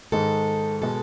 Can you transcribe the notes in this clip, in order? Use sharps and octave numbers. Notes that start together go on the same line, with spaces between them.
G#2 D#3 G#3 A4
B2 G#3 A4